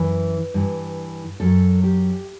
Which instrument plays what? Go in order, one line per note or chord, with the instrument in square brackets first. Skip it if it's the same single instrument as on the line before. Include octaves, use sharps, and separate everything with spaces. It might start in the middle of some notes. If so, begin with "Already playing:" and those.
Already playing: [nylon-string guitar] F#2 E3 B4
G2 E3
F#2 F#3 A4
G4